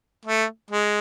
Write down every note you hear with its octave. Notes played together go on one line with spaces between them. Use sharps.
A3
G#3